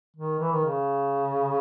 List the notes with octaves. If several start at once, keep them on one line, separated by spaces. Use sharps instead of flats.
D#3
E3
D#3
C#3